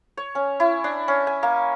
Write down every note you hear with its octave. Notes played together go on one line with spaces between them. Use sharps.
C#5
C#4
E4
D4
C#4
G#5
A#3